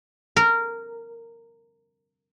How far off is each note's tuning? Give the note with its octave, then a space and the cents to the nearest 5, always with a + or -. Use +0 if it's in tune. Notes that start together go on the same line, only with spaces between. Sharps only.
A#4 -15